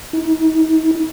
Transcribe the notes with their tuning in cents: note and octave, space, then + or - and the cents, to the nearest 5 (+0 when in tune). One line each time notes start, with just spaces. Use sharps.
D#4 +40